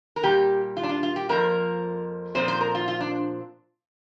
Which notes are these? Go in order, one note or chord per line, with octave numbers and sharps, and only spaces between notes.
A#4
A#2 G3 A#3 G4
F4
D4
F4
F4
G4
F2 F3 A#3 A#4
A#2 F3 C4 C5
C5
A#4
F4
F4
D4